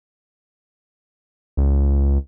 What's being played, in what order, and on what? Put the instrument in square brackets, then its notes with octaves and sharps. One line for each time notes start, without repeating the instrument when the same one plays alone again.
[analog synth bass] C#2